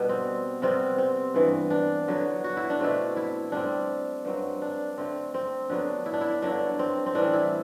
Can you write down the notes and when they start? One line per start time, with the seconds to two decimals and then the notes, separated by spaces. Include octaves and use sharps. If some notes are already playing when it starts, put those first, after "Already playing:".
Already playing: B2 G3 B3 D4
0.09 C4
0.62 C3 G3 B3 C4
0.98 C4
1.34 G2 E3 B3
1.70 D4
2.08 D3 F#3 B3
2.44 F#4
2.57 E4
2.70 D4
2.79 B2 A3 C4 E4
3.17 E4
3.52 D3 G3 C4 D4
4.25 G2 F#3 C4
4.62 D4
4.98 D3 A3 C4
5.34 C4
5.70 D3 F#3 B3 D4
6.06 E4
6.13 D4
6.21 E4
6.42 G2 D3 F#3 D4
6.79 C4
7.06 C4
7.15 A2 E3 G3 D4
7.33 E4